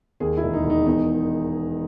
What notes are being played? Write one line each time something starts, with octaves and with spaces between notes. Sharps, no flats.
D#2 G#4
E4
E1
D#4
E1
D#4
E2 D#4